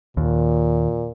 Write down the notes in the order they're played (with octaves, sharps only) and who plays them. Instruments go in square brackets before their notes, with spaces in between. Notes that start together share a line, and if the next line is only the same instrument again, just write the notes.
[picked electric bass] D#2 [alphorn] A#2